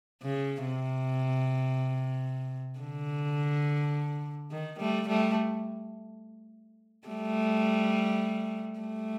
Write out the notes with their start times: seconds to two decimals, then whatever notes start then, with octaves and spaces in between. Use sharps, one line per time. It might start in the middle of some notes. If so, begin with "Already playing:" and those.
0.23 C#3
0.65 C3
2.80 D3
4.51 D#3
4.79 G3 A3
5.08 G3 A3
7.08 G3 A3
8.79 G3 A3